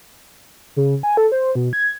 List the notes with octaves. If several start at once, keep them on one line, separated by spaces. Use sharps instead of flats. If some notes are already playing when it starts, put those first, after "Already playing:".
C#3
G#5
A4
C5
B2
G#6